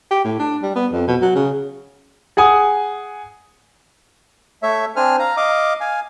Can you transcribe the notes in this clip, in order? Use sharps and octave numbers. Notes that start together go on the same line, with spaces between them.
G4
A2
D4
G3
B3
F2
B2
F#3
C#3
G#4 F#5 G#5 D#6
A3 C#5 E5
C4 D4 C5 G#5 F6
F5 A#5
D#5 F5 D6
F5 G#5